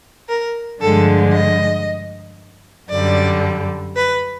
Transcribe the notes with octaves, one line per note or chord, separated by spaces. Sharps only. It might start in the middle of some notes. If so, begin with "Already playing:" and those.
A#4
G2 D3 F3 G#3 A4
D#5
F#2 D3 G3 D5
B4